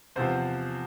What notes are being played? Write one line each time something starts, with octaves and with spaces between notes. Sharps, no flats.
E2 C3 F3 C5